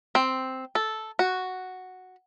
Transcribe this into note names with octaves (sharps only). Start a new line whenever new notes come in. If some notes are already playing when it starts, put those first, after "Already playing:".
C4
A4
F#4